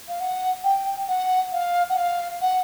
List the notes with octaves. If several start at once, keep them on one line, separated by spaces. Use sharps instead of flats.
F5
F#5
G5
F#5
F5
F#5
F5
F#5